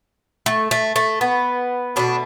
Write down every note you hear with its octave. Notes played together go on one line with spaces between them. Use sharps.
A3
A3
A3
B3
B2 A3 D4